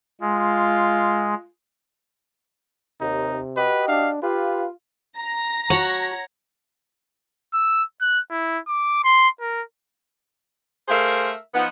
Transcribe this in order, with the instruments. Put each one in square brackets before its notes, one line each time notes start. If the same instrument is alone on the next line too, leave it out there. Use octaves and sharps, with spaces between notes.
[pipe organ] G#3 [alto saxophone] F4
[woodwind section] D#2 [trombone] C3 [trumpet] D#4
[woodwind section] F#4 G4 D#5 [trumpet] B4
[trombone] D4 [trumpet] F5
[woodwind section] F4 [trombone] G4 [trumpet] B4
[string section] A#5 A#6
[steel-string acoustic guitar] F#4 A5 [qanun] C#5 F#5
[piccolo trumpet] E6
F#6
E4
D6
C6
A#4
[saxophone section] A3 G#4 A#4 C5 E5 F5
F3 B3 D#4